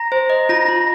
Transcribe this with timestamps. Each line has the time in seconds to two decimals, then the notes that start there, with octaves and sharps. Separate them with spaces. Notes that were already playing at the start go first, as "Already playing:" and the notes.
Already playing: A#5 A#6
0.12 C5
0.30 D#5
0.49 F4 A#5 A#6
0.69 F4